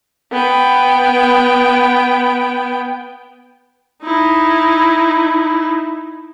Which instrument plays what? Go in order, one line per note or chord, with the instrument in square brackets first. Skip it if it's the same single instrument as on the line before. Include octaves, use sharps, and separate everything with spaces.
[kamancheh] B3 G5
[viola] D#4 E4